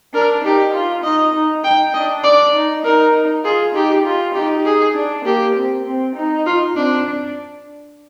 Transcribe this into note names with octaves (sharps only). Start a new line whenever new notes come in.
D4 A#4
D#4 G4
F4
D#4 D#5
D#4
D#4 G5
D4 D#5
D4 D5
D#4
D#4 A#4
F4 G#4
D#4 G4
F4
D#4 G4
G#4
D4
A#3 G4
C4
C4
D#4
F4
C4 D4
D4